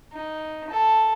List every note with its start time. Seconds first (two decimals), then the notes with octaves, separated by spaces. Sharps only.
0.13 D#4
0.70 A4